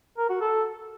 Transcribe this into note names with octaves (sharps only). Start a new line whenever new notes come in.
A#4
F#4
A4